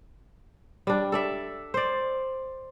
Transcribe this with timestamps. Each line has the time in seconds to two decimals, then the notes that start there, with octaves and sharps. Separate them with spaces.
0.87 G3 D4
1.12 A4 D5 E5
1.74 C5 D5